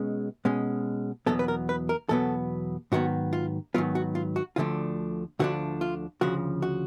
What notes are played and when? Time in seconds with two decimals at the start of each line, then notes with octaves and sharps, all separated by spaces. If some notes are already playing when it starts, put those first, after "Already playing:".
Already playing: B2 G#3 C#4
0.45 B2 G#3 C#4
1.26 E2 B2 F#3 B3 A4
1.39 B4
1.48 A#4
1.69 B4
1.89 A#4
2.09 E2 B2 F#3 B3 A4
2.92 G#2 D#3 F#3 B3 F#4
3.33 F4
3.74 G#2 D#3 F#3 B3 F4
3.95 F#4
4.15 F4
4.36 F#4
4.56 D2 D3 F3 A3 D4 F4
5.39 D2 D3 F3 A3 D4 F#4
5.81 F4
6.21 D2 C#3 F3 F#4
6.62 F#4